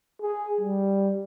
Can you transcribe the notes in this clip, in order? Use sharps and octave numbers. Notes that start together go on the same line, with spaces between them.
G#4
G3